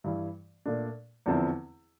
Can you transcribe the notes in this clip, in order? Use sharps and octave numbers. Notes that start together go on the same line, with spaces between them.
G2 E3 G3
A#2 A3 D4
E2 D3 F3 C4 E4